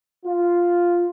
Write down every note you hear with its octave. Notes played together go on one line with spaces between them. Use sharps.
F4